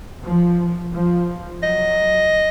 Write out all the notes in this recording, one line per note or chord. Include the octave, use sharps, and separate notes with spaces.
F3
F3
F#3 D#5